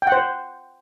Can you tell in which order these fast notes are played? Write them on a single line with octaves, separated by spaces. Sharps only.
G5 F#5 C5